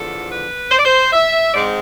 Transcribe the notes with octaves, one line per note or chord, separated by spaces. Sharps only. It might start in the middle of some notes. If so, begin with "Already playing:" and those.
Already playing: E2 D3 F3 A4
B4
C5
D5
C5
E5
G#2 G#3 C4 D5